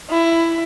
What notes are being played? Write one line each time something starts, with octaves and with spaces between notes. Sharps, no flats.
E4